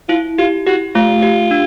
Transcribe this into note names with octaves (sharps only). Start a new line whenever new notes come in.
E4 F4
F4 G4
F#4 G4
A3 F4
G4
D4